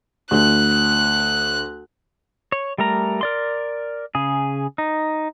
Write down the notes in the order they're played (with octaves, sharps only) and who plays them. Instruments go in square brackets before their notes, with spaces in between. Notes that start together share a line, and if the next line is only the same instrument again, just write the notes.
[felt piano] D2 [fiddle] F#6
[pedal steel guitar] C#5
G3 A3 A#4 A#5
A#4 D5 C6
C#3 G#4
D#4